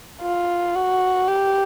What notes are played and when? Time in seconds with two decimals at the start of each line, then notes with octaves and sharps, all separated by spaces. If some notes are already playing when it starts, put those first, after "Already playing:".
0.22 F4
0.75 F#4
1.28 G4